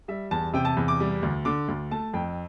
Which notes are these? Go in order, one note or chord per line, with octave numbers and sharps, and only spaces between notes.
G3 E5
E2 A5
C3 G5
A5
E2
D6
G3
D2
D3 D6
D2
A3 A5
F2 G5